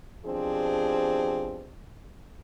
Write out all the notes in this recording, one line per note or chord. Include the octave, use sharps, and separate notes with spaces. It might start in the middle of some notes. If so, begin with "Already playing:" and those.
B2 F3 C4 D4 G4 G#4